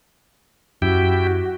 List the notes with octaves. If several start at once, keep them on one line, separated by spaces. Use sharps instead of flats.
F#2 E4 F#4 G4 G5